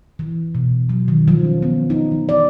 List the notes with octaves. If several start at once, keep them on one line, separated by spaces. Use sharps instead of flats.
E3
B2
F#3
D#3
F3
C#4
B3
D#4
E3
D5